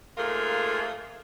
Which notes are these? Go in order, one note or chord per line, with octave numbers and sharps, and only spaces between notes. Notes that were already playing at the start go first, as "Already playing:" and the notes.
G#2 A3 A#3 F4 G#4 A#4